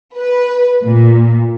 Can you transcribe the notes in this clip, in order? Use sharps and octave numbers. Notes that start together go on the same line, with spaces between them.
B4
A#2